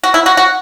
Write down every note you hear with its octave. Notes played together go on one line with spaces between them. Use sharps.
F#4
E4
F#4
F#4